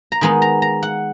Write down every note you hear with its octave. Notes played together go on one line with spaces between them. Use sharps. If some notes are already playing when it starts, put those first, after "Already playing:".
A#5
D#3 G#3 B3 D#4 B5
A#5
A#5
F#5